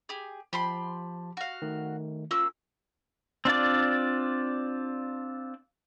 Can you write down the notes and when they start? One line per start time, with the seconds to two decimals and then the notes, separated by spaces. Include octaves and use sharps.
0.09 G4 G#4
0.53 F3 G4 A5 B5 C6
1.37 F#4 F5
1.62 D#3 A3
2.31 A#3 C#4 F4 E6
3.45 C4 D4 F4 D5